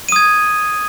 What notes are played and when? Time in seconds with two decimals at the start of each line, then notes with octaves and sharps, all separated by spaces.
0.09 D#7
0.12 D#6
0.16 G#6